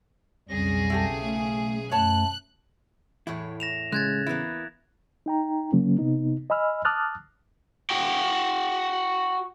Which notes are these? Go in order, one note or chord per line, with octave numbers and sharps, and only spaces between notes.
B1 F2 C#3 G3 G#4 A#6
E4 G4 A4
A3
F#2 A3 C#5 A5 F#6
E2 A2 E4 C#5
A#6 E7 F7
C#3 G#3 F#6 G#6 A6
E3 A#3 B3 E4
D#4 G5 A#5
C#3 F#3 A#3 C#4
C3 B3 D#4
D#5 G#5 B5 E6 F6
A5 D6 D#6 F6 F#6 A6
F#4 G5